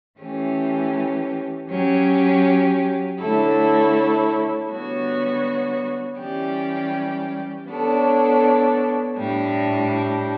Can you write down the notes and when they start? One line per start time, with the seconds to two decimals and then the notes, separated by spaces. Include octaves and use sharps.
0.19 E3 A3 C#4 G4
1.69 F#3 C#4 G4
3.19 D3 A3 E4 A4 C#5
4.68 D3 G3 B3 F#4 C#5
6.18 E3 G3 C#4 G4 D5
7.67 B3 D4 A4 C#5
9.17 A2 G3 D4